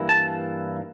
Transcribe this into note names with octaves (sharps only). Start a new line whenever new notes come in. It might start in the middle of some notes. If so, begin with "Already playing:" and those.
Already playing: G2 E3 A#3 E4
A5